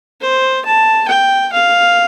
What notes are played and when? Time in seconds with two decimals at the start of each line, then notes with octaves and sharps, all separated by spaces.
0.21 C5
0.65 A5
1.08 G5
1.53 F5